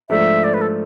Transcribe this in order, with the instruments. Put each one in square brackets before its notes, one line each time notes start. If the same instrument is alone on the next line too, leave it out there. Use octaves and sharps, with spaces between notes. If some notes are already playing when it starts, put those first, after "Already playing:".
[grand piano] G#2 F3 A3 D4 [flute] E5
[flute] D5
B4
A4